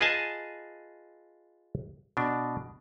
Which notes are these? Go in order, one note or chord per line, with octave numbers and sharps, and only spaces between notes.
F4 G#4 B4 D#5 G#5 A5
B2 D4